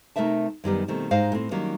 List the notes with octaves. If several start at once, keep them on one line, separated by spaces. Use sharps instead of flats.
C3 A3 D#4 A#4 E5 A5
F#2 D#3 G3 B3
B2 D#3 A3 C4
G#2 D#4 C5 F5
A2 C4
D#3 F#3 G3 A#3 C#4